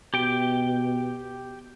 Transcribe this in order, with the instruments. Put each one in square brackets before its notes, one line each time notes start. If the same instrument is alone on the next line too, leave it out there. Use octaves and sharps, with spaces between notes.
[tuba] B2 [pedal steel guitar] G4 G5